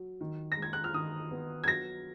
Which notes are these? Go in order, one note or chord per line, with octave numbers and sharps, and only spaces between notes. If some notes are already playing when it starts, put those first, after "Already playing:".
Already playing: F#3
D#3
A#6
G#3
G#6
F#6
F6
D#3 D#6
B3
G#6
F#3 A#6